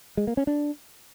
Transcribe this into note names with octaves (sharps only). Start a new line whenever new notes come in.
G#3
A#3
C#4
D4